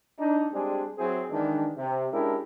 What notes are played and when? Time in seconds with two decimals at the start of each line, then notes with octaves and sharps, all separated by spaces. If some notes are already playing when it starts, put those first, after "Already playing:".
0.18 D4 D#4
0.53 G3 G#3 C4 D4 G#4
0.98 F#3 C4 E4 G#4
1.30 D#3 E3 G#3 D4
1.76 C3
2.11 G#3 C#4 D4 E4 G4 A#4